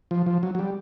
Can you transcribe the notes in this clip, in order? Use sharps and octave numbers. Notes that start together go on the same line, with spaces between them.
F3
F3
F#3
F#3
G3